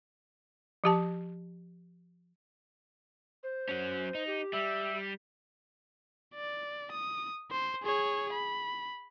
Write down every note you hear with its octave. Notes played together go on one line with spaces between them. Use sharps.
F3 G4 A5
C5
F#3 C#4
D#4
G4
G3 E5
D5
D#6
C5
G#4 C#5
B5